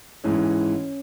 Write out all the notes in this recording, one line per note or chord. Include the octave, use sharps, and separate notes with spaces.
G#2 E3 C#4